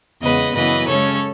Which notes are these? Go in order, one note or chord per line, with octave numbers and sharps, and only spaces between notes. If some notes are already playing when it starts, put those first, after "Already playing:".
E2 C#3 G#3 B3 B4 D#5
F#2 C#3 E3 B3 B4 D#5
C#3 G#3 C#4 A4 C#5